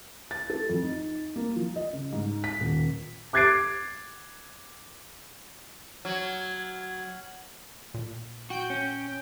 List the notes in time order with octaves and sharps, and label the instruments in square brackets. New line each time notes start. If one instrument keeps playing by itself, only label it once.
[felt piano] A6
A4
F2
D#4
A#3
F3
D#5
C#3
G#2
B6
D#1
[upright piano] D6 F#6 G#6 A6 C7 D7
[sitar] F#3 [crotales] F6 G#6 F#7
[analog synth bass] A#2
[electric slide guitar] F#4 [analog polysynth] G5 G6
[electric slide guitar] C#4